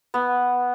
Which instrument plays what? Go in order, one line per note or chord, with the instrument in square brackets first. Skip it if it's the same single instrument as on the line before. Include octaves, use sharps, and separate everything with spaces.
[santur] B3